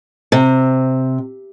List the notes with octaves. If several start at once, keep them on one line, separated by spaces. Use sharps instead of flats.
C3